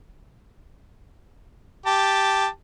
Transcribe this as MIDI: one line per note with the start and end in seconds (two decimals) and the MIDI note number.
1.86 2.47 67
1.86 2.47 81